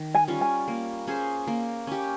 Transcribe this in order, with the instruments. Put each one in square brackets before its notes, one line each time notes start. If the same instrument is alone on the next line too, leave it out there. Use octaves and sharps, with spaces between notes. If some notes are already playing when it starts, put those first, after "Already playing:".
Already playing: [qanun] D#3
[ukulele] G#5
[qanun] G3 C#4 F4
[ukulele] G#5
[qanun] A#3
C#4 G#4 C5
A#3
C#4 G4